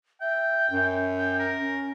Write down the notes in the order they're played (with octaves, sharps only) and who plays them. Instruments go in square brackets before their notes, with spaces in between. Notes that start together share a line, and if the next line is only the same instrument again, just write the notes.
[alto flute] E5 [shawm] G5
[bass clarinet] F#2 [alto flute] C#4
[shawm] G5
A#4
[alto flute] C#4